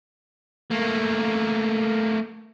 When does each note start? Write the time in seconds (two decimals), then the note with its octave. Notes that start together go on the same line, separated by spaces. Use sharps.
0.71 A3 A#3